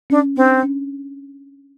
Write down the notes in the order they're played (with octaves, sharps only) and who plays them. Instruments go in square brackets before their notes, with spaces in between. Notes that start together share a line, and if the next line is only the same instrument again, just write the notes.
[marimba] C#4 [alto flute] D4
[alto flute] C4 [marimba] D4
[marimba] C#4